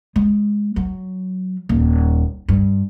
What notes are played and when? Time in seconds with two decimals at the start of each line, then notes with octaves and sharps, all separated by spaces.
0.16 G#3
0.76 F#3
1.69 D#1
2.48 G2